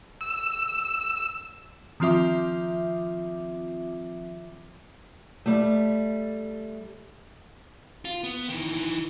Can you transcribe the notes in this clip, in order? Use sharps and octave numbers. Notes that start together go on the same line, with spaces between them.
E6
D#3 F3 C4 F4 E5 D6
G3 A3
F4
B3
D#3 E3